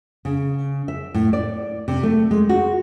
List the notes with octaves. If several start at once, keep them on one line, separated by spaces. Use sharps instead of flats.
C#3
E5
A2
D5
C3
A3
G#3
F#4